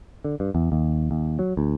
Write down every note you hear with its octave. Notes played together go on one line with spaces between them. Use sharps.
D3
G2
E2
D#2
D#2
F#3
D2